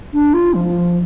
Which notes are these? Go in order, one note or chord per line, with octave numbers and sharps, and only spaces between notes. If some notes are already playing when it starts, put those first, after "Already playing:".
D4
F4
F3